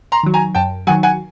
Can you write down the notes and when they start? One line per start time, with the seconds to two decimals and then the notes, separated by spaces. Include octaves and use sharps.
0.12 A#5 C6
0.23 D#3 F#3
0.34 G#5 A#5
0.55 F#2 G5 A5
0.87 D#3 F#3 F#5 G#5
1.03 F#5 G#5